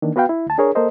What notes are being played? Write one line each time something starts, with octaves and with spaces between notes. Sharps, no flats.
D#3 E3 A#3 D4
B3 F#4 B4 F5 G5
E4
D2 A5
D4 G#4 A#4 C#5
A#3 A4 A#4 C5 D#5